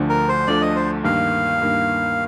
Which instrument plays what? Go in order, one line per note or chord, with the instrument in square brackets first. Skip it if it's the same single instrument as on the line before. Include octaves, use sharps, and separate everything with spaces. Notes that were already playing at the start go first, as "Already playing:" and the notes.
Already playing: [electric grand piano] D2 D3 F3 A3 D4
[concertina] A#4
C5
[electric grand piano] D2 D3 F3 A3 D4 [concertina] D5
[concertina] D#5
C5
[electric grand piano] G2 D#3 A#3 [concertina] F5
[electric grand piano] G2 D#3 A#3